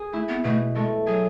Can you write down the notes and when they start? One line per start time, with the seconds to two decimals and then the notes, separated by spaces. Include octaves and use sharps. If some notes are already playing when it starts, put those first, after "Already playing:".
Already playing: G#4
0.13 A3 E4
0.29 B3
0.44 B2 A3
0.75 G#3 A3
1.07 F#3 G#4